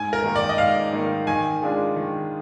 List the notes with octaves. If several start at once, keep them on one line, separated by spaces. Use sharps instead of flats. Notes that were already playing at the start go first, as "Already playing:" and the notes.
Already playing: G#2 G#5
A#4
D#3 A#3 D#4
D5
D#5
G#2 F5
D#3 A#3 D#4
D#3 G#5
G#3 D4 F4 G#4
D#3